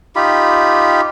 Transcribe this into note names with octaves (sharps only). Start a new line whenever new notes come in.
D#4 F4 G4 B5